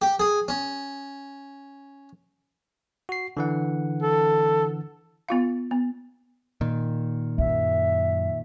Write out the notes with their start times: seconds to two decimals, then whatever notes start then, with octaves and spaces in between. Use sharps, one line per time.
0.02 G4
0.20 G#4
0.48 C#4
3.09 F#4 C7
3.37 D3 E3 F#5
4.02 A4
5.29 B3 F4 F5
5.71 B3
6.61 A#2 D#3
7.38 F#2 E5